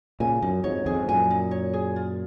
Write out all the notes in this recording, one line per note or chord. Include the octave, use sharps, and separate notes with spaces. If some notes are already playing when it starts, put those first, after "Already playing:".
A#2 C#3 G#5
F#2 D#4
F2 G#2 C#5
F2 G#2 G#4
F#2 A#2 G#5
D#4
C#5
G#4
F4